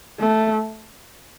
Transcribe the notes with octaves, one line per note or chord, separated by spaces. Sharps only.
A3